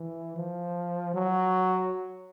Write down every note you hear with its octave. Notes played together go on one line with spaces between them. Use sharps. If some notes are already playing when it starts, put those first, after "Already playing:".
Already playing: E3
F3
F#3